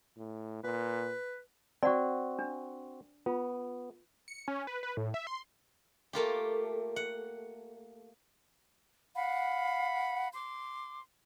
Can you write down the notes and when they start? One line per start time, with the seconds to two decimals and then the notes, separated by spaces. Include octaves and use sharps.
0.18 A2
0.64 A#2 B4
1.83 C4 F#4 D5 F#5
2.39 D4
3.26 B3 F4
4.28 C#7
4.48 C#4
4.67 B4
4.83 B4
4.97 A2
5.14 E5
5.27 C6
6.13 A3 A#3 F4 G4
6.96 F#5
9.15 F5 F#5 B5
10.34 C6 D6